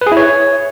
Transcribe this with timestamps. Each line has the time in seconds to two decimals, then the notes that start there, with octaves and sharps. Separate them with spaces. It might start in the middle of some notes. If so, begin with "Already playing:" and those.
0.01 B4
0.07 G#4
0.12 E4
0.17 C#5